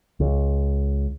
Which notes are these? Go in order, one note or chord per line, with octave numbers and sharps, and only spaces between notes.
C#2